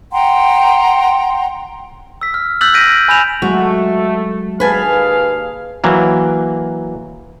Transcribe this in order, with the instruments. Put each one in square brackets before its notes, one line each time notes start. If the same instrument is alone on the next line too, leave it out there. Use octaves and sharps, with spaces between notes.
[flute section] F#5 G5 A#5 C6
[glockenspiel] E6 B6
F6
E6 F#6 G6 A6 B6 F#7
F6 G6 A#6 B6 D7 D#7
B6
G#5 B5 G6 E7 F7
[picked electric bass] F#3 G#3 [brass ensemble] A3 [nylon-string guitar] F#4
[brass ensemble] D#2 G#4 F5 [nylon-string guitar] B4 G#5 A5
[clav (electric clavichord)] E3 F#3 A#3